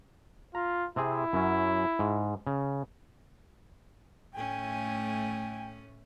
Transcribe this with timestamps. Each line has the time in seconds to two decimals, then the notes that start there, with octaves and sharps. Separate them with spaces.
0.55 F4 A#5
0.96 C3 C4 E4 G#4
1.33 F#2 F#3 C#4
1.99 G#2
2.47 C#3
4.34 A2 A3 C#4 G5 G#5